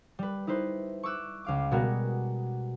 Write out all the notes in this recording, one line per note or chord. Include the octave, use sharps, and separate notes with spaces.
G3 B4
D#4 E4 B4 C5
C#6 D6 E6 F#6
C#2 F5 D6
B2 G3 G#3 B3 F#4 A#4